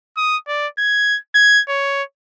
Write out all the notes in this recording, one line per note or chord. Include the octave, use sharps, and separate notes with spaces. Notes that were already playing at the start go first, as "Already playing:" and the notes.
D#6
D5
G#6
G#6
C#5